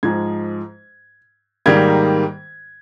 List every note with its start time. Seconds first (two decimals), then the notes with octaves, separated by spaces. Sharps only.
0.03 G#2 F3 G#3 G#6
1.66 G#2 D#3 G3 A#3 G#6